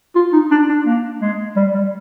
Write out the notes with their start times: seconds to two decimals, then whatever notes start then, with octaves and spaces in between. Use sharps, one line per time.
0.15 F4
0.33 D#4
0.51 D4
0.69 D4
0.86 A#3
1.21 G#3
1.56 G3
1.74 G3